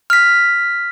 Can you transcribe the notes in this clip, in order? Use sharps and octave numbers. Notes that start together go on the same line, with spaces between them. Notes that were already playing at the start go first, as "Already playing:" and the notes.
F6 B6